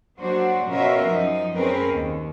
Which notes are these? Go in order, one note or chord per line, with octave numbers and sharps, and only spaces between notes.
F#3 A#3 D4 F#4 C5
B2 C#4 F4 F#4 A#4 E5
F#2 F3 D#4
C4 C#4 G#4 A#4 B4
D#2